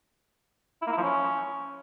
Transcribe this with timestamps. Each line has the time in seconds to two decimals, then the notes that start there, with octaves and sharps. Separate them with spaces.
0.82 E4
0.87 A#3
0.92 E4
0.97 F3
1.02 C#4